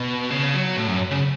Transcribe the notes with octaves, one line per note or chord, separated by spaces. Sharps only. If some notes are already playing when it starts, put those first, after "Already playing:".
Already playing: B2
C#3
F#3
A2
F#2
C#3